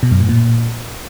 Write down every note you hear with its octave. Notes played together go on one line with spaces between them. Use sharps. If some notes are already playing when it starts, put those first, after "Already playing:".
B2
F#2
A2
A#2